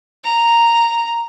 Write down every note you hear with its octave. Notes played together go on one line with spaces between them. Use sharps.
A#5